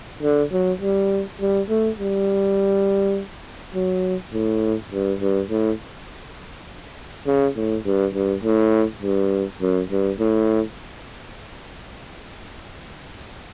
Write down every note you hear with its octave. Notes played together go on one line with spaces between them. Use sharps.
D3
F#3
G3
G3
A3
G3
F#3
A2
G2
G2
A2
C#3
A2
G2
G2
A2
G2
F#2
G2
A2